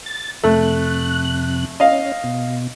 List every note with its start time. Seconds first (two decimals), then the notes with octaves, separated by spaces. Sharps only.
0.06 A6
0.44 F2 C3 A3 F#6
1.80 C#4 D#5 F5
2.24 B2